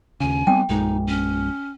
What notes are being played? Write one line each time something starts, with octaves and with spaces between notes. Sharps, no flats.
D#2 C#3 G#5
G3 B3 C4 G5
A#1 F#2 G#3 D#4
C#4